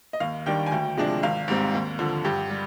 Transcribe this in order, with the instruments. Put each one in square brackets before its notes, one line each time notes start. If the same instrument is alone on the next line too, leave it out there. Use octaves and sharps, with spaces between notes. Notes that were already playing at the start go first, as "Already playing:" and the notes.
[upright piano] D#5
D#2 F5
D#3 G3 D4 G5
G#5
D2 G5
C3 F3 G#3 D4
G#1 F5
G#2 G3 C4
D#2
D3 F3
G2 G4
G3